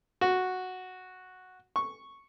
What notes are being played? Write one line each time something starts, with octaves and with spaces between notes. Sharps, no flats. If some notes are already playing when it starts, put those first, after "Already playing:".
F#4
C#6